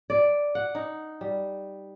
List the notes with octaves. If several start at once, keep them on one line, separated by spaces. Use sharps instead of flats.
D5
F#5
D#4
G3